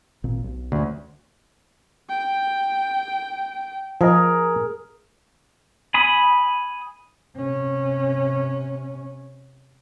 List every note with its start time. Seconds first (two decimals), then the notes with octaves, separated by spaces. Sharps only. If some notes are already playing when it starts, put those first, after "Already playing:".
0.24 G#1 A#2 C4
0.44 B1
0.72 D2
2.09 G5
4.01 F3 G#4 A#4 D#5
5.94 G#5 B5 D#6
7.36 C3 C#4